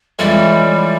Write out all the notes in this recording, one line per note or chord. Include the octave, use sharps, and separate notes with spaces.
F2 C#3 E3 G3 G#3